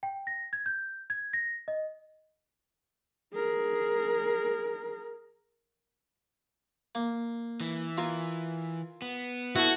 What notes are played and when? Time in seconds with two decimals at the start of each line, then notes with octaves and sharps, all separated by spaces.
0.03 G5
0.27 A#6
0.53 G#6
0.66 G6
1.10 G#6
1.33 A#6
1.68 D#5
3.34 G#4 A#4
6.95 A#3
7.61 E3
7.98 F4 A#4 G#5
9.02 B3
9.56 E4 F#4 A4